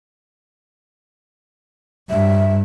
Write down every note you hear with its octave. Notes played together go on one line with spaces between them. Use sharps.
G2 E5